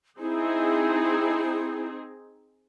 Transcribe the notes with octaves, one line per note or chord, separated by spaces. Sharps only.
C4 D#4 E4 G#4